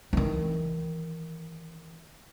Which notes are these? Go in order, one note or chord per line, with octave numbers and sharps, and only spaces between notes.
D#3 E3